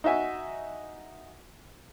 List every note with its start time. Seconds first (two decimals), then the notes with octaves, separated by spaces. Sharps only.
0.04 D#4 F#4 E5 G#5